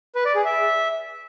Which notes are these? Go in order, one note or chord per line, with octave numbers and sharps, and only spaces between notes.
B4
D5
G#4
E5